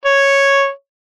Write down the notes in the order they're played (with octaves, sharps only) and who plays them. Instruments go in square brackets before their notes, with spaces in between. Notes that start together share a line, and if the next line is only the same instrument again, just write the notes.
[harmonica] C#5